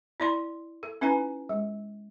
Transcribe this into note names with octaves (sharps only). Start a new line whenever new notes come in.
E4 D5 C6
A4
C#4 D#4 E4 B4 G#5 A#5
G#3